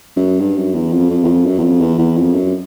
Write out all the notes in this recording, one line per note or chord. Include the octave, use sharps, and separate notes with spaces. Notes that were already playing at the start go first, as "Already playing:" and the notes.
F#2
G2
F#2
E2
F2
F2
E2
F2
F#2
E2
F2
E2
E2
F2
F#2